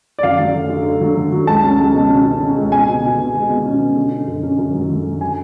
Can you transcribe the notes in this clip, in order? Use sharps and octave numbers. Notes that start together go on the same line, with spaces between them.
D5
F#2 F5
F#3
A3
D3
D3
F#3
A3
F#3
C#2 A5
C#4
C#2
B2
C#4
C#4
C#4
C#2
B2 G#5
B2
B2
B2
G#3
B2
C#4
B2
D3
C#4
F#2
C#4
F#2
F#3
F#3
F#3
G#5